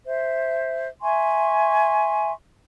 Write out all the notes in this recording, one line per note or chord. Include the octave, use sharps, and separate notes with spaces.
C5 E5
E5 G#5 C6 C#6